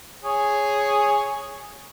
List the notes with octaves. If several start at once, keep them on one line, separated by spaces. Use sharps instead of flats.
G#4 C#5